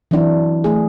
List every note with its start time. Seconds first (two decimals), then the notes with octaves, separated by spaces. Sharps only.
0.11 E3 F#3 C4 D4 E4
0.64 A3 G#4